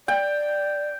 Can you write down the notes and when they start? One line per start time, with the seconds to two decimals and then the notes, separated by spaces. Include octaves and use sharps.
0.08 D5 G5